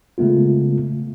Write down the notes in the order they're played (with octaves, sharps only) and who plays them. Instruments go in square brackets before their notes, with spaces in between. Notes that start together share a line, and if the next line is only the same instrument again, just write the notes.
[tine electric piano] C#3 G#3 A3 B3 F4